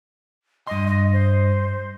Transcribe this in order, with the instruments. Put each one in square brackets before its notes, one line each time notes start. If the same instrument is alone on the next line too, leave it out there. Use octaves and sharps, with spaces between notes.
[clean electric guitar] G2 C6 [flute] D#5
[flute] D#5
C5